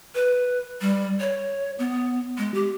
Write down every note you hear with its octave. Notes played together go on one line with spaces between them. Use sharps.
B4
G3
C#5
B3
G#3
G4